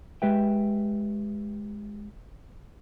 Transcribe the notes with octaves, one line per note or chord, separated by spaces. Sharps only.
G#3 G4 B4 E5 G5